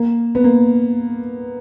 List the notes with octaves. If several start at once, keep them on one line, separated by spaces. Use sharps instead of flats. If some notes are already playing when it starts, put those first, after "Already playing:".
Already playing: A#3
B3
A#3